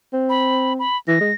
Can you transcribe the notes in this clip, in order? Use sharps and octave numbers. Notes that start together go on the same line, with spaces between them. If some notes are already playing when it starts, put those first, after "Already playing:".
C4
B5
B5
E3 A#6
G#3